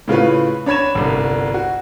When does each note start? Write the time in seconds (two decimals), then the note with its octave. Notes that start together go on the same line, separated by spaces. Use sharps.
0.08 A2 C#3 F4 B4
0.66 D4 C#5 B5 G#6 E7
0.95 G1 C2
1.54 F#4